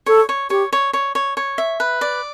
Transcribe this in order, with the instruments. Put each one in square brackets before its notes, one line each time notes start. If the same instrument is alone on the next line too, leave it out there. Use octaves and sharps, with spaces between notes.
[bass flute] A4 [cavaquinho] C#5
[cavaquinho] C#5
[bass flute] G4 [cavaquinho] C#5
[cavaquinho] C#5
C#5
C#5
C#5
E5
B4
D5